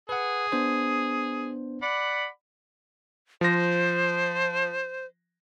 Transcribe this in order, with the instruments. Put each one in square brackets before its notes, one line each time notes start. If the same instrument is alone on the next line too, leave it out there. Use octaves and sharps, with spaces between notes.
[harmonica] G#4 [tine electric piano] B4 F#5
[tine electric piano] B3 D4 C5
[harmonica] D5 F#5 B5
[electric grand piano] F3 A#6 [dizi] C5